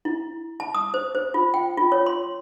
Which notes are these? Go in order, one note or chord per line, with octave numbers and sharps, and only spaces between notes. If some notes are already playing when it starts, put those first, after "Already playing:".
E4
A5
D#6
C5
C5
F4
G5
F4
C#5
C6